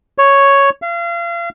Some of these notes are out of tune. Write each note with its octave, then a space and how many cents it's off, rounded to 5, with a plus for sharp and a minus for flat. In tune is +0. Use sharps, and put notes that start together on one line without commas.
C#5 +0
F5 -35